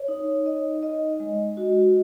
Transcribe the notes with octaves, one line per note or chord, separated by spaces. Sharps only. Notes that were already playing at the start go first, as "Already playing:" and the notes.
Already playing: C#5
D#4
D#5
D#5
G#3
F#4